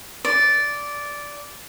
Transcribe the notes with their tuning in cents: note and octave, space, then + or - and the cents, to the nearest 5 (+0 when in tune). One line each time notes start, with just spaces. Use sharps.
D5 -10